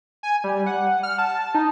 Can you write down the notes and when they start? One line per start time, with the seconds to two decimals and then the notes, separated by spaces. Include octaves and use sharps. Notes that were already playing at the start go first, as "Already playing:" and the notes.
0.23 G#5
0.44 G3
0.66 F#5
1.03 F6
1.18 A5
1.55 D#4